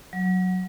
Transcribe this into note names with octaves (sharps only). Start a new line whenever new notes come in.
F#3